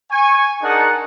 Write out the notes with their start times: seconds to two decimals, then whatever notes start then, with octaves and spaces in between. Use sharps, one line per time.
0.11 G#5 C#6
0.62 D4 D#4 G#4 A#4 F#5 A5